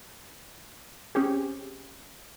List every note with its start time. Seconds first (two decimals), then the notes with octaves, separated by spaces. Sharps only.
1.15 C4 C#4 G4 G#4